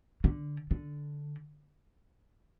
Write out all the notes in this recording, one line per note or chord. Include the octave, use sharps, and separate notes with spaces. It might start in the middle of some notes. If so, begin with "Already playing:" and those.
D3
D3